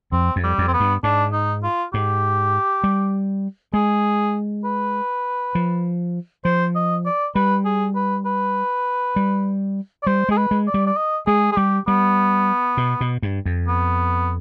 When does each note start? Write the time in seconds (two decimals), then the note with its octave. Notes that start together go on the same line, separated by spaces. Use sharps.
0.12 F2 C4
0.36 F2
0.44 G3
0.58 F2
0.68 C4
0.73 B3
0.80 G2
1.03 G#2 D4
1.33 D#4
1.63 F4
1.93 G#2 G4
2.84 G3
3.74 G#3 G#4
4.64 B4
5.55 F3
6.45 F3 C5
6.75 D#5
7.06 D5
7.35 G3 B4
7.65 G#4
7.95 B4
8.25 B4
9.16 G3
10.03 D5
10.06 G3 C5
10.29 G#3 G#4
10.37 B4
10.51 G#3
10.67 D5
10.74 G3
10.86 D5
10.97 D#5
11.27 G#3 G#4
11.52 G#4
11.57 G3 G4
11.87 G3 B3
12.77 B2
13.01 B2
13.22 G2
13.46 F2
13.68 B3